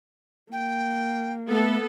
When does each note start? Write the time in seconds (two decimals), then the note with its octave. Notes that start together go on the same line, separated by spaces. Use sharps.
0.52 A#3 G5
1.49 A3 B3 A4